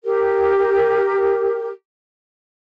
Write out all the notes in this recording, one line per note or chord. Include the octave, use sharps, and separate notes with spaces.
G4 A#4